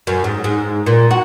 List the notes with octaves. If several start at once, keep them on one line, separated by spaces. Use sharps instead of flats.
F#2
G#2
G#2
A#2
F#4